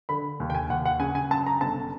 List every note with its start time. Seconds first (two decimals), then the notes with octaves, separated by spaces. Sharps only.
0.09 D3 B5
0.40 D#2
0.50 G5
0.55 G#5
0.70 D#2 F#5
0.85 F#5
1.00 C#3 G#5
1.15 G#5
1.31 F#2 A5
1.46 A#5
1.61 G1 A5